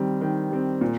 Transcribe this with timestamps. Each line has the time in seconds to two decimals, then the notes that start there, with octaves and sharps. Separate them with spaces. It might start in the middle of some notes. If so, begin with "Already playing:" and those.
Already playing: D#3 G3 C4
0.21 D#3
0.51 G3 C4
0.81 A#2